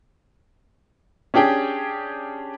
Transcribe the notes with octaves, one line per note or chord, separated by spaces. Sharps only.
C#4 D4 G4 G#4 G5